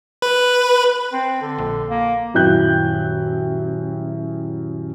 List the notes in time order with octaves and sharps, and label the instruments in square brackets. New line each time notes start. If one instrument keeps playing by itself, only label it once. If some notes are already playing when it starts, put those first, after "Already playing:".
[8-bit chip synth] B4
[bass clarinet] C4
D3
[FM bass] A#1
[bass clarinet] A#3
[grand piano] D#1 F#2 E4 G5 F#6 G6